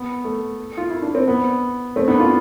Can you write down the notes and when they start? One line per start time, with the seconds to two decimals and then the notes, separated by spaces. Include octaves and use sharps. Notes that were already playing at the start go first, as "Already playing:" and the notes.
Already playing: B3
0.24 A3
0.77 F4
0.90 E4
1.02 D4
1.15 C4
1.28 B3
1.96 A3 C4
2.08 B3 D4
2.20 D4 F4